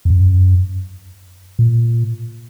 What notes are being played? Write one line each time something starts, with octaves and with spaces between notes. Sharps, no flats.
F2
F#2
A#2